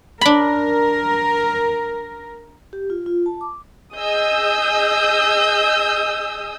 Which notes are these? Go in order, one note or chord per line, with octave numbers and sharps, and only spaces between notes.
D4 A#4 B5
G4
F4
F4
A5
D6
G#4 D#5 D#6 E6 G6